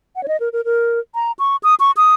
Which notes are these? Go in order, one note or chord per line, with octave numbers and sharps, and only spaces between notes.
F#5
C#5
D#5
A#4
A#4
A#4
A#5
C#6
D#6
C#6
D#6